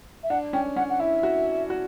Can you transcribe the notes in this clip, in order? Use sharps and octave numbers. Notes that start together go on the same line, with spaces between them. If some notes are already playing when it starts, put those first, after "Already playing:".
E5
D4 F#5
C#4 G5
C#4 F#5
F#5
E4 E5
F#4
F#4